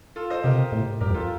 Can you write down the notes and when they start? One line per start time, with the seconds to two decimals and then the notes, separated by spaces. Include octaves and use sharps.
0.16 F4 A4
0.30 C5 D#5
0.44 C3 G4 A#4
0.72 A2
1.01 G2 G4 A#4
1.10 F2
1.14 F4 A4